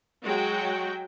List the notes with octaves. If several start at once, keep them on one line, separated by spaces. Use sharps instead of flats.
F#3 G#3 F#4 G5